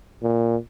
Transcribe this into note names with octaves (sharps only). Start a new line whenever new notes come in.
A#2